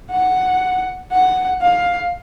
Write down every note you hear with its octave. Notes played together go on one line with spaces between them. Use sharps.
F#5
F#5
F5